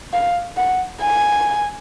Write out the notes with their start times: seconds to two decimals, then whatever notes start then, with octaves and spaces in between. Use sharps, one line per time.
0.13 F5
0.57 F#5
1.02 G#5